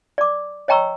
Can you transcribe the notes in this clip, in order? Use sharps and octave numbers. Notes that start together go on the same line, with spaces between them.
D5 D6
C#5 D#5 G5 A#5 C#6 E6